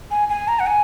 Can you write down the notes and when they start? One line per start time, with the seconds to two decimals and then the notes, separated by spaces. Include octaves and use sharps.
0.11 G#5
0.29 G#5
0.48 A#5
0.60 F#5
0.66 G#5